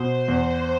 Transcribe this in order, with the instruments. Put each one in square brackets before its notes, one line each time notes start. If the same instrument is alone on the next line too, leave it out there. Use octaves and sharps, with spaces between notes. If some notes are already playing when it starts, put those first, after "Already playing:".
Already playing: [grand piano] B2 [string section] C5
[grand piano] E2